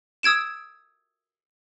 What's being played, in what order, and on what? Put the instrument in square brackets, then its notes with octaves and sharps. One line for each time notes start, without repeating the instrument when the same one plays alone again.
[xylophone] D#6 E6 G#6 D7 E7